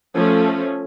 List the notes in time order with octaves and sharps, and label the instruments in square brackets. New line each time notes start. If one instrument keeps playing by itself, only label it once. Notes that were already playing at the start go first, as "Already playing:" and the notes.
[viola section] F3 A3 C#4